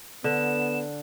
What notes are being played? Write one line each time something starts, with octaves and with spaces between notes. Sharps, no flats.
D3 B3 E7